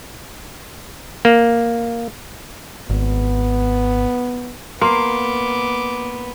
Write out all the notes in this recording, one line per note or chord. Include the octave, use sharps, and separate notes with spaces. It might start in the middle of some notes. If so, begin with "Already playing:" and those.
A#3
G#1 B3
A#3 B3 C6 D6